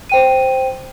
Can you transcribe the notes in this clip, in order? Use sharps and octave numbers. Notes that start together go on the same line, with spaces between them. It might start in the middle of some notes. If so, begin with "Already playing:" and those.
C5 G5 D#7